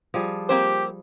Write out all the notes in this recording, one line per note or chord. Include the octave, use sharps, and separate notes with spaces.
F3 G3 G#4
A#3 C4 G4 C5